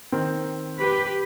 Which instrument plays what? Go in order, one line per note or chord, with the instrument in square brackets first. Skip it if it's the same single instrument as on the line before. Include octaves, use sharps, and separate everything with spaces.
[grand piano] D#3 C4
[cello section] G4 B4